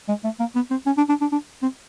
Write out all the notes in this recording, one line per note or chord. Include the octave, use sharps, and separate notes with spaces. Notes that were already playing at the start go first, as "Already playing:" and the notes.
G#3
A3
A#3
B3
C4
C#4
D4
D4
D4
D4
C4